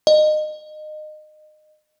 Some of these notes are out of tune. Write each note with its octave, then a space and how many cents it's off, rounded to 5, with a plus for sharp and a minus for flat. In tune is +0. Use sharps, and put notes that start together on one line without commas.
D#5 -25